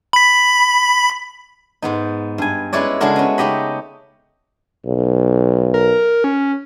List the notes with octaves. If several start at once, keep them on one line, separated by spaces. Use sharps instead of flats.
B5 B6
G#2 B3 D#4
G2 G#5
G#3 C#4 E4 B4 C#5 D5
C#3 G#3 A3 D4 F#4 A#4
B3 C#4
C#3 D#4 G4 D#5 B5
B1
A#4
C#4